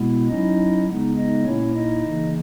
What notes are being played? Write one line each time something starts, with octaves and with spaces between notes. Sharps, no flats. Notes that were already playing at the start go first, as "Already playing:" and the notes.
Already playing: B2 G#3 B3 E4
F#3 C#4 D#4 E4 D#5
C#3 G#3 B3 D#4
D#4 D#5
A#2 A#3 C#4 E4 C#5
D#4 D#5
C#3 E3 A#3